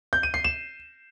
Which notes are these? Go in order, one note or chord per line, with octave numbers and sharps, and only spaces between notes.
G6
D#7
C7
E7